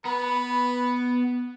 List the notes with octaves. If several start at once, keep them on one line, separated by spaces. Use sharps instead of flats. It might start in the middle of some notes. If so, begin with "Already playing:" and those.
B3 B4